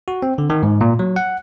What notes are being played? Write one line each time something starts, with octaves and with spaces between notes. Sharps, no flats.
F#4
C4
D3
D#3
G#2
A#2
F#3
F#5